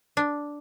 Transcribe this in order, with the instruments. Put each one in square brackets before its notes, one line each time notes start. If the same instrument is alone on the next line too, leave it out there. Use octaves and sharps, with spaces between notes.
[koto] D4